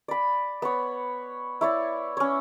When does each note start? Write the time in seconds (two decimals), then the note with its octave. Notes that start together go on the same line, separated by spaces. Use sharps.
0.08 D5 B5
0.62 B3 C#5
1.61 E4 C#5 D5
2.17 C#4 C#5